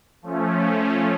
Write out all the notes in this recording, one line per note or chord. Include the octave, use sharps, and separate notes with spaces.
F3 A3 C#4